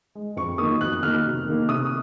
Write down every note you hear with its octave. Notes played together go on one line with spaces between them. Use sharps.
G#3
F2 C#6
D#3 F#3 A#3 D#6
F2 F#6
D#3 F#3 A#3 F6
C3
D#3 A#3
C3 D#6